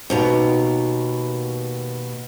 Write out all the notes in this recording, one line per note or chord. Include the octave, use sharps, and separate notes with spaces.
D#2 B2 A#5